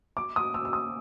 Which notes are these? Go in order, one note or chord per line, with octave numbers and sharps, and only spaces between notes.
D6
D#6
E6
E6
D#6